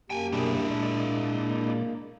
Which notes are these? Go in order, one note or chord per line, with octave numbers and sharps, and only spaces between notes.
F#2 A#3 G4 G5 G#5
B2 G3 D4 E4 G#4
A#2 G#3 A#3 D5